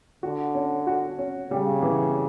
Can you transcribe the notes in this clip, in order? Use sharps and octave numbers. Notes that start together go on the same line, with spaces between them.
D3 F#4
C#4
F#4
C#4
C#3 G3
E3